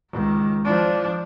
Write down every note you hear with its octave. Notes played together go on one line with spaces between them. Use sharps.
C#2 D#3
F3 D4